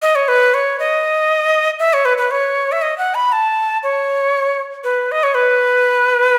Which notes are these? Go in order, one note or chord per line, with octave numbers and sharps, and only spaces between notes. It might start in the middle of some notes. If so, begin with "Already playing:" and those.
D#5
C#5
B4
C#5
D#5
E5
C#5
B4
B4
C#5
E5
D#5
F#5
B5
A5
C#5
B4
D#5
C#5
B4